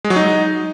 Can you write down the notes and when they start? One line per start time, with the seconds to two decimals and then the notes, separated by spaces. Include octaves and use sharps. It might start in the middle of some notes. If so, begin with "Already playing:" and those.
0.04 G#3
0.10 F#3
0.16 D#4